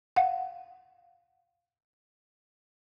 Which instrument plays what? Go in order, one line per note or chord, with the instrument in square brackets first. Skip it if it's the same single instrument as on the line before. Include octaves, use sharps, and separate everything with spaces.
[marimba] F5 F#5